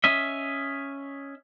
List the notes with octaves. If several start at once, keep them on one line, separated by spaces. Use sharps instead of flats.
C#4 D#5 E5